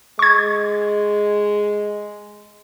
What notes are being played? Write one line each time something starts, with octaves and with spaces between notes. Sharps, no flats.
G#3 C#6 G#6